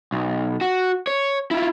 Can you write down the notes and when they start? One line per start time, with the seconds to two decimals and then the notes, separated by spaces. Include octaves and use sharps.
0.12 B1
0.61 F#4
1.07 C#5
1.51 E4 F4